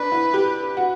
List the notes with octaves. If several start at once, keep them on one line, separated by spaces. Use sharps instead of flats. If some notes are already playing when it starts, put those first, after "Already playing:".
Already playing: D4 B4
E4
G4
F#4